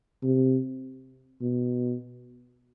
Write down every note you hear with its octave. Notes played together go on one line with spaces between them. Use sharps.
C3
B2